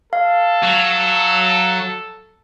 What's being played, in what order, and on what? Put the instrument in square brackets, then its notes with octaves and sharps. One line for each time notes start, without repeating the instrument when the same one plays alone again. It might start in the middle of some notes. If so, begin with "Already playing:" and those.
[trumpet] A4 [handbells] F5
[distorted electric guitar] F#3